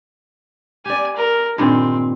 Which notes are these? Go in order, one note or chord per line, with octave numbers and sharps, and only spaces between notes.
G4 D5 G#5
A#4
G2 A#2 D#3 C4